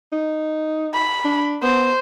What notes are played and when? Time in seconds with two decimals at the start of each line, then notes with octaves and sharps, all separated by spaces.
0.13 D#4
0.94 B5
1.25 D4
1.63 B3 C5